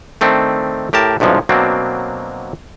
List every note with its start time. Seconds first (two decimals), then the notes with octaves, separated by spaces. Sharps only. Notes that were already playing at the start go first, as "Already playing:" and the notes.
0.21 D#3 A3 C4 D4
0.93 A2 G4 A#4 A5
1.20 B1 G2 C3 F3 G#3
1.49 B2 F#3 A#3 C4 D4